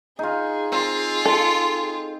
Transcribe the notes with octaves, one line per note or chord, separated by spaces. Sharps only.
D#4 F4 G#4
C4 F4
A4